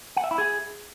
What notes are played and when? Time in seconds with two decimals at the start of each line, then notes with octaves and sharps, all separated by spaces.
0.17 F#5
0.24 E5
0.31 E4
0.38 G#4